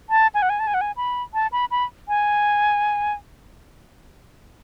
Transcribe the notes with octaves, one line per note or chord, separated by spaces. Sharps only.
A5
G#5
F#5
G#5
A5
G#5
F#5
G#5
B5
A5
B5
B5
G#5